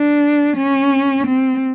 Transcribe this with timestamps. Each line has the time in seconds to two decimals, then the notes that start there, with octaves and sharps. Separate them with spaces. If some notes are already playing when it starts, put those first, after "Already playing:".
Already playing: D4
0.57 C#4
1.27 C4